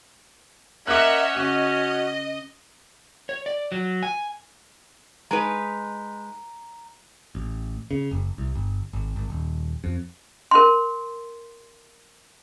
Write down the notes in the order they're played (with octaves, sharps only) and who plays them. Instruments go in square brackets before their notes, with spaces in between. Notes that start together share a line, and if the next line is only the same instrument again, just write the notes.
[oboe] C#4 [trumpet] A#4 [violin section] D#5 E5 F#5 [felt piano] D6 F#6
[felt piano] C#3 [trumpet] F#4 [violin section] D#5
[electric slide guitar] C#5
D5
F#3
G#5
[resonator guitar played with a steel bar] G#3 D#4 B4 [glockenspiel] A#5
[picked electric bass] A1
C#3
F#1
C2
G1
G#1
G#1
D#1
F2
[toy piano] A#4 C6